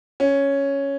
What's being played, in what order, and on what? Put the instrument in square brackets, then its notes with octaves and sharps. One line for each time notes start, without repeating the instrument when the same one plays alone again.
[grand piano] C#4